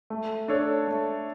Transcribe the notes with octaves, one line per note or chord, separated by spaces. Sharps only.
A3
D4 A4 C#5
A3